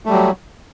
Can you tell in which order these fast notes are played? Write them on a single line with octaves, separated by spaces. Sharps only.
A3 G3 F#3